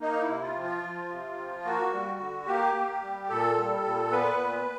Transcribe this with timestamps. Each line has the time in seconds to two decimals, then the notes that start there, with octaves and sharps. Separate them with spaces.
0.01 A#3 D#4
0.21 E4
0.28 C3
0.42 F4
0.55 F3
0.62 F4
0.83 F3
1.10 C3
1.38 F3
1.65 A#3 F#4
1.92 G3
2.20 D3
2.47 A#3 G4
2.75 A#3
3.02 G3
3.29 A#2 A4
3.57 G3
3.84 A#2
4.12 B3 B4
4.39 A#2